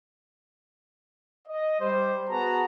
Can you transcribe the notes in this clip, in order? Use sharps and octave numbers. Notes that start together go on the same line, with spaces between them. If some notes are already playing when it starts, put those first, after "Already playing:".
D#5
G3 C5
B3 F#4 G#4 B4 A5 A#5